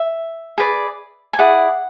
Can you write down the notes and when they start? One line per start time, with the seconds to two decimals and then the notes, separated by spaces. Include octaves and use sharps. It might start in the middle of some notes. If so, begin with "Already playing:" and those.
Already playing: E5
0.58 G#4 B4 D5
1.33 G#5
1.38 E4 G#4 D5 F#5